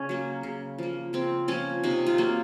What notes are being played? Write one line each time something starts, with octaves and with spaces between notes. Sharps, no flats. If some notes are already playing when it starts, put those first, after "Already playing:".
Already playing: C#3 C#4
F#3 A#3
C#3
F3 A#3
C#3 C4
F3 A#3 C#4
C3 D#4
F4
F#3 A#3